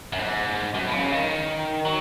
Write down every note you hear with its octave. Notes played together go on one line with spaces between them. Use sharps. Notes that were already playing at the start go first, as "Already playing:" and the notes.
F#2
G#2
F#2
B2
C#3
D#3
F#3